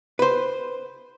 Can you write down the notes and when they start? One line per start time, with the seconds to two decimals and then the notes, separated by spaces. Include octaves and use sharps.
0.19 B4 C5